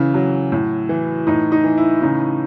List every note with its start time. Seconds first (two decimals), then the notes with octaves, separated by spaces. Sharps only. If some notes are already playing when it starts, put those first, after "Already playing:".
Already playing: C#3 E3
0.14 F#3
0.52 A2
0.89 E3
1.27 A2 D#4
1.52 D#4
1.64 E3
1.77 E4
2.02 C#3 D#4